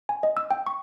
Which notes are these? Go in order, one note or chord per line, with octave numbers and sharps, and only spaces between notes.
G#5
D#5
E6
G5
C#6